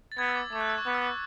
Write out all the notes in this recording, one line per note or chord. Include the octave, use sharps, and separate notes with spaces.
A6
B3 G#6
E6
D6
A3 D6
F#6
E6
C#6
B3 D6
E6
D6